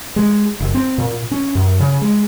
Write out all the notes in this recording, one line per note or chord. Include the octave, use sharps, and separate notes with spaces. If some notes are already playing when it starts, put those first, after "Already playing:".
G#3
F#1
C4
A#2
C#4
F#2
C#3
G#3